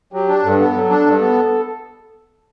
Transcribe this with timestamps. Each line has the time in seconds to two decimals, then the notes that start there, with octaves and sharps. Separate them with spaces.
0.13 F#3 G4
0.28 D4
0.44 G2 A4
0.60 B3
0.74 F#3 A4
0.90 D4
1.06 G2
1.21 B3